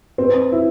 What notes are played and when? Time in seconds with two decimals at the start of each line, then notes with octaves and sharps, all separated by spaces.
0.18 C4 B4
0.52 E4